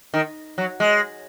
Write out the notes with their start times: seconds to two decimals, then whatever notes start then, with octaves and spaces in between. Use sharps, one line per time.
0.14 D#3
0.58 F#3
0.80 G#3